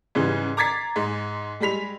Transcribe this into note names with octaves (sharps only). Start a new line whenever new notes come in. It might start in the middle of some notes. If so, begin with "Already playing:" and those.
G#2 C#3 E3 G3
A#5 D6 G#6 A6 B6 C7
G#2 G#3
G3 G#3 B5 B6 F7